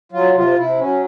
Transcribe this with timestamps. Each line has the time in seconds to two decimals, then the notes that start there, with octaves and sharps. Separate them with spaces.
0.12 F#3 F4
0.34 C3 F4
0.56 C3 E4
0.78 F#3 C#4